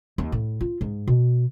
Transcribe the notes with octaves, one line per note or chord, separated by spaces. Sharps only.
D#2
A2
F4
G#2
B2